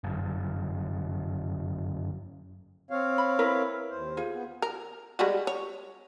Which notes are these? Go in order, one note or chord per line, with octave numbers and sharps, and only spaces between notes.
G1 F#2
C4 C#5 F5
B5
E4 A#4 B4
D#2 C5
F4 G#4
B3
A#4
G3 G#3 F#4
C#5